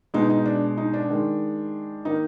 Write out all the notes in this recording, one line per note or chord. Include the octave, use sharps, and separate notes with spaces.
B2 G#3 D#4
D#4
D4
D#4
D4
D#3 G#3
D#3 A#3 D#4